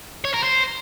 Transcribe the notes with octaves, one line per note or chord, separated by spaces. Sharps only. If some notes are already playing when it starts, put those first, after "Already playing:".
C#5
A#4
C5